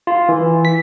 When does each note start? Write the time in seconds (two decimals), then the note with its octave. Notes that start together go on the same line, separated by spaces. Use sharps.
0.07 F4
0.29 E3
0.65 B6